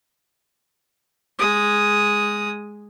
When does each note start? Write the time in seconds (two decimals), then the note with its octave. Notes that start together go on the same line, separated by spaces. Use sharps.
1.39 G#3 D#6